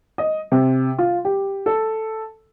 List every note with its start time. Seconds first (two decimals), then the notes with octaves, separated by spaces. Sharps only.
0.18 D#5
0.52 C3
0.99 F4
1.25 G4
1.66 A4